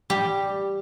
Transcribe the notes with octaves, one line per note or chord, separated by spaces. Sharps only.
G3 G4